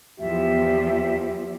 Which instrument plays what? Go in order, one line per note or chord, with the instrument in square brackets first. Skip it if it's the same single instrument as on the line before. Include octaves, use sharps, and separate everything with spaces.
[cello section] E2 F3 [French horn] G4 [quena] E5